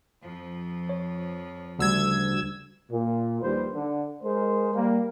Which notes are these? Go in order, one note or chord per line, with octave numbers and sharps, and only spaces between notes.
F2 F3
C#5
D2 C#3 G3 E6 G#6
A#2
A#1 D#2 A#2 G3 B4 C5
D3
G#3 A#4 C5
G3 A#3